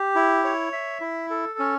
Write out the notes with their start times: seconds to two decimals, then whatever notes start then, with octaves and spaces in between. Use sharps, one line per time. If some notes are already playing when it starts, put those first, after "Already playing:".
Already playing: G4
0.15 E4
0.44 C#5
0.73 E5
1.01 E4
1.30 A4
1.59 C#4